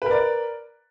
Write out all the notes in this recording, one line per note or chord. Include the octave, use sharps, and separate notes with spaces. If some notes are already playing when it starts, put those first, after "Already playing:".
A#4 B4 D5